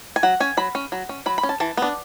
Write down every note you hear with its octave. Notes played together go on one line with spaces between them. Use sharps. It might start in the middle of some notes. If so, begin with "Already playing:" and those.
G#5
F#3 F#5
C#4 G#5
F#3 B5
C#4
F#3
C#4
F#3 B5
B5
C#4
A5
E3 A5
B3 D4